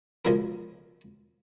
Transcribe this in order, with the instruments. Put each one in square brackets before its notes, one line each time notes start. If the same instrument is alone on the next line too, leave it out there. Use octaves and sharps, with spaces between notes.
[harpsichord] C#2 F3 F#3 B3 A#4